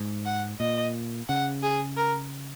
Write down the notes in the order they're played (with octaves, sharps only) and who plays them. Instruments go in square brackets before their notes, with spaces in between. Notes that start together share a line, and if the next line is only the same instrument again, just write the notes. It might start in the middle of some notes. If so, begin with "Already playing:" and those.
Already playing: [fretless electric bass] G#2
[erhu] F#5
[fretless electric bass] A#2 [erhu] D#5
[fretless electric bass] C#3 [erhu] F#5
[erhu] G#4
A#4